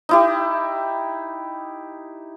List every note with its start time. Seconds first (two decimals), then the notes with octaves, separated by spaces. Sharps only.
0.09 D#4 E4 G4